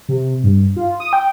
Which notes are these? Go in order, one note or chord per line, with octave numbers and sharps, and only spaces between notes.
C3
G2
F4
D#6
G5